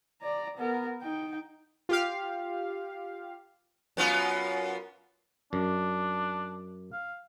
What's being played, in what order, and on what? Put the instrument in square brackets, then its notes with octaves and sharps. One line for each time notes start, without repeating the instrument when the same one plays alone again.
[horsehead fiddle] D5 A#5
B3 A#4
D#4 G5
[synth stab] F4 G4 F5
[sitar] F#2 B3 F4
[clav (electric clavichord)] F#2 [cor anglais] D4
[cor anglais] F5